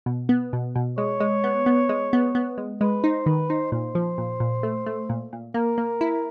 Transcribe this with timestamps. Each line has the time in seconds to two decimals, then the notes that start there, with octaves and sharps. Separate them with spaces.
0.06 B2
0.29 B3
0.53 B2
0.76 B2
0.98 G#3 C#5
1.20 G#3
1.44 B3
1.66 B3
1.89 G#3
2.13 B3
2.35 B3
2.58 G#3
2.81 G#3 B4
3.03 D#4 C5
3.26 D#3 B4
3.50 D#4 C5
3.72 A#2 C5
3.95 F3
4.18 A#2
4.40 A#2
4.63 A3
4.86 A3
5.09 A#2
5.33 A#2
5.54 A#3 A#4
5.78 A#3
6.01 E4